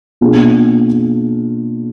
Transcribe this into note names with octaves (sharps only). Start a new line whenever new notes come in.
B2 A#3 D4 F4 G#4